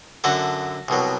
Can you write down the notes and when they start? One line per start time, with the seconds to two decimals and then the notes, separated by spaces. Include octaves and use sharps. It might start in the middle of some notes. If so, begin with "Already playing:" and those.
0.24 F#2 D3 F#3 F#4 A4
0.88 C2 B2 F#3